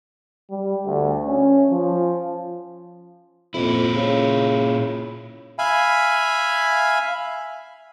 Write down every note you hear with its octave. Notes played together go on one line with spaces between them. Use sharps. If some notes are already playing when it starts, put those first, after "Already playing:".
G3
D2
C#4
F3
F2 A#2 E4
C#3
E5 F5 G#5 B5